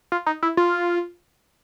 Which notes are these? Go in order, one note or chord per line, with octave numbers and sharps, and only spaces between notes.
F4
D#4
E4
F4